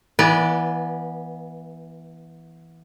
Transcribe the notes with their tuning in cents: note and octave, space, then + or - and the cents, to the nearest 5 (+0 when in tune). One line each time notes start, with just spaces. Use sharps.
E3 +0 B3 -25 D5 +5